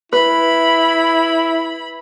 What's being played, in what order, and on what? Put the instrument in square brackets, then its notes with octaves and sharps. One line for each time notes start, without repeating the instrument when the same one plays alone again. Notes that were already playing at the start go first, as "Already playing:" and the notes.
[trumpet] E4 [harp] B4 [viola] B5